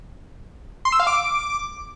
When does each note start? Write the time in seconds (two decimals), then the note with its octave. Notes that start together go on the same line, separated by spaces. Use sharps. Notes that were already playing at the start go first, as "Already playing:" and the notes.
0.85 C6
0.92 E6
1.00 F5
1.07 D6